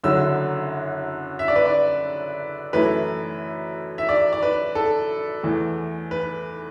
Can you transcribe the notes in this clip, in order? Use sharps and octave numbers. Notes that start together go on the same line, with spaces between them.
F#1 F#2 D3 F#3 E6
E5
D5
B4
D5
F#2 E3 A3 E4 B4
E5
D5
D5
B4
A4
E2 E3 A3
B4